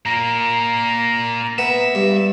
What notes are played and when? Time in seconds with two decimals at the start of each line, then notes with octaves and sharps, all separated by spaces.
0.06 A#2 A#3 A#5
1.59 B3 E5
1.95 G2